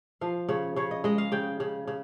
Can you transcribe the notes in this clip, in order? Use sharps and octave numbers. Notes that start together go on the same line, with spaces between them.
F3 F5
C#3 C#5
C#3 C#5
D#5
G#3 D#5
F5
C#3 G5
C#3
C#3